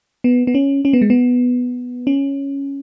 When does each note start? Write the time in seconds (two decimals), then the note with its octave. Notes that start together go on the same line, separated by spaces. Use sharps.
0.24 B3
0.47 B3
0.55 C#4
0.85 C#4
0.93 B3
1.02 G#3
1.10 B3
2.07 C#4